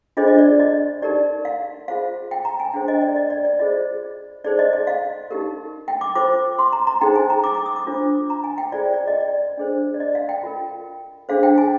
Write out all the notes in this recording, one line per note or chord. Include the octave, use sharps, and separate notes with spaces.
D4 F4 G#4 C5 D#5
D#5
D5
D#5
D#4 G4 A#4 D5
F5
F4 G#4 C5 F5
G5
A#5
G#5
D4 G#4 C5 G5
D#5
D5
D#5
D5
D5
F4 G#4 C5 D#5
D#4 G#4 C5 D5
D#5
D#5
F5
D#4 G4 A#4
G5
D6
F4 C5 D6
C6
A#5
A#5
D#4 G#4 C5 G5
G#5
A#5
D6
D6
D#6
D6
D4 F4 C5
A#5
G#5
G5
F4 G#4 C5 D5
D5
D#5
D5
D4 G#4 C5
D5
D#5
F5
G5
F4 A#4
D4 G#4 C5 F5
G5
G#5